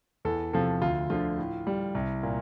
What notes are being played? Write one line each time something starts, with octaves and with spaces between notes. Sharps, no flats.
E2 A4
C3 F3 A4
D2 F4
D3 F3 F4
A2
G3
C2
A#2